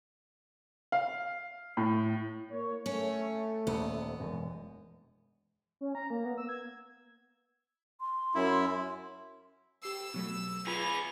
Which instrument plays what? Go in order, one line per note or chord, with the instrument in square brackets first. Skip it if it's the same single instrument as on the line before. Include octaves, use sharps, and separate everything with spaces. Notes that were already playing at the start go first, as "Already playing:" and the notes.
[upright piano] F5
A2
[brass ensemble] A#3 C#5
[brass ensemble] A3 [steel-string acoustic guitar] C#4
[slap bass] D#1 D#2 C3 [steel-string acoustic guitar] B3
[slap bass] E1 F#2
[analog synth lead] C#4
A#5
A#3
B3
E6
G#6
[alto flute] C6
[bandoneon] F#2 E4
[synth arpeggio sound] G4 C7 [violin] E6
[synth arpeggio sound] B2 F#3 A3
[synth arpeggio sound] F4 [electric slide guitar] G#4 B4 [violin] F7